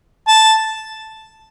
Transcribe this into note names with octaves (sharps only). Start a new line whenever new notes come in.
A5